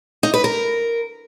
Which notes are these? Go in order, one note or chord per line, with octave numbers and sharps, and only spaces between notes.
D#4
B4
A#4